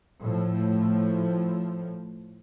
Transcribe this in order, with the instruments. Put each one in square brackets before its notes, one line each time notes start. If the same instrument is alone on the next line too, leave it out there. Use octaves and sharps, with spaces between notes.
[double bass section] A2 F3